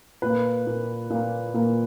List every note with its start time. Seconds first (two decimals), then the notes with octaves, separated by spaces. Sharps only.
0.22 A#2 A#3 B4
0.66 A#2 A#3
1.10 A#2 A#3
1.54 A#2 A#3